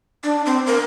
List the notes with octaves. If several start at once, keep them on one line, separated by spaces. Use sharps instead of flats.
D4
C4
A#4